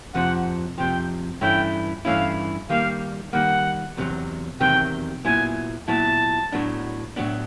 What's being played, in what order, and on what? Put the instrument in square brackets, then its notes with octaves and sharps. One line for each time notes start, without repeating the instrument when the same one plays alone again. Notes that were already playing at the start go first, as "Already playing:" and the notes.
[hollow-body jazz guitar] F2 C3 F3 [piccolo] F#5
[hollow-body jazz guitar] F2 C3 F3 [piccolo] G5
[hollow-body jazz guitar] G2 E3 A3 C#4 E4 [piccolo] G5
[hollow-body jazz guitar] G2 E3 A3 C#4 E4 [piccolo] F5
[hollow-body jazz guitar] D#3 G3 A#3 [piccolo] F5
[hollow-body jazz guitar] D#3 G3 A#3 [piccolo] F#5
[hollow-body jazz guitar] E2 C3 D#3 F#3
[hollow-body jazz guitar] E2 C3 D#3 F#3 [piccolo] G5
[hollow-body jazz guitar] A#2 F#3 B3 E4 [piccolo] G#5
[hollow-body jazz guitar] A#2 F#3 B3 E4 [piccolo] A5
[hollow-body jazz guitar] A2 F#3 B3 D4
A2 F#3 B3 D4